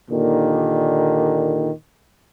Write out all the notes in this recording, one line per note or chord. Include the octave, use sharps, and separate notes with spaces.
D#2 A#2 D3 D#3